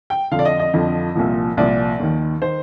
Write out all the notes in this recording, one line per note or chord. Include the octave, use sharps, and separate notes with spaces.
G5
F2 D3 F3 F5
D5
D#5
D#5
F2 D3 F3
C2 A#2 F3
C2 A#2 F3 D5
D#2 D#3
D#3 C5